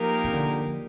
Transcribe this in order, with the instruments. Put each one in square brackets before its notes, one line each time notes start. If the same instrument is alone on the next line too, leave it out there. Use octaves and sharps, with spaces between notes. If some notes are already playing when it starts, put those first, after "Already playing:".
Already playing: [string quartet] F3 A#3 D#4 G4 A#4
[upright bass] C3
D3
F3